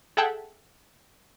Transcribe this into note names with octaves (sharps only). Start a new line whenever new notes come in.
G#4 A4 E5 F#5 G5 A5